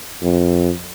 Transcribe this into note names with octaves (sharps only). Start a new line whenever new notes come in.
F2